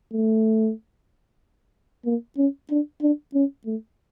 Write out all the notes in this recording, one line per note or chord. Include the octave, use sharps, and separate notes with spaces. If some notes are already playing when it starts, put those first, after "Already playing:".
A3
A#3
C#4
D4
D4
C#4
A3